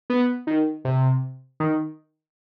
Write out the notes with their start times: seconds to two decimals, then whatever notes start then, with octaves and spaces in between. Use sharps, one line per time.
0.10 B3
0.47 D#3
0.85 C3
1.60 D#3